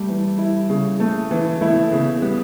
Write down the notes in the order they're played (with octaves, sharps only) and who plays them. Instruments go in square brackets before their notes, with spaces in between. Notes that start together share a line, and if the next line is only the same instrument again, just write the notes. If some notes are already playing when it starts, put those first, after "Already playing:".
Already playing: [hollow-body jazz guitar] G3 [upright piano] A3
[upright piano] E3
E4
C#3
A3
E3
[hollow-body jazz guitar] A3 [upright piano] E4
[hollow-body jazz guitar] B3
A3
[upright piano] C#3 [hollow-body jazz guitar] B3
[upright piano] G3 [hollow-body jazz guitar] B3